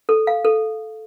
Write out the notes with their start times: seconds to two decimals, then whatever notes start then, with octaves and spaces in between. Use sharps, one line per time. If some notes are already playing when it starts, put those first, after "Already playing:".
0.09 A4
0.27 F5
0.45 A4